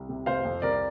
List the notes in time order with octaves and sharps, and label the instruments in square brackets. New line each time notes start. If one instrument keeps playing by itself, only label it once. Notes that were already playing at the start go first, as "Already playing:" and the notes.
Already playing: [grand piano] C2
C3
F1 C5 F5
F2
C2 A#4 D5